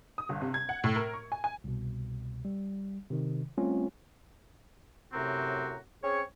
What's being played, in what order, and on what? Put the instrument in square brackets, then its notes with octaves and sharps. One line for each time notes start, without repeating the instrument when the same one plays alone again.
[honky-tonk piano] D#6
G1
C3
G#6
F#5
A2
A#4
C#6
G#5
G#5
[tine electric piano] C2 B2
G3
C3 D#3
G3 A3 C4 C#4 F4
[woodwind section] F#2 A2 C3 C4 F#4 A#5
C4 C#4 G#4 C#5